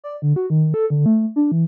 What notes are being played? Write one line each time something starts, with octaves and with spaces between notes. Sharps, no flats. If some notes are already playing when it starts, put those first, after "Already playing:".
D5
D3
F#4
D#3
A4
D3
A3
D4
E3